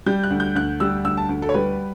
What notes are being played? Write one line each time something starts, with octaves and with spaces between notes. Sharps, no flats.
G3 G6
F#6
D2
G6
D2 F#6
G3 E6
D2 E6
A5
D2
A4
C#5
G3 B4